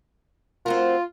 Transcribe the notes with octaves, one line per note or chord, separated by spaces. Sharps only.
C4 F4 F#4 A#4